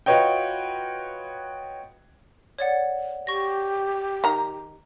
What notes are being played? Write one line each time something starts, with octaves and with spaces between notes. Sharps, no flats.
F4 F#4 B4 C#5 D#5 G5
C#5 D5 F#5
G4 C#6 A#6
D#3 A#5